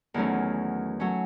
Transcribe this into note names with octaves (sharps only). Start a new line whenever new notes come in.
E2 D#3 F#3 A3 C#4
F#3 A3 C#4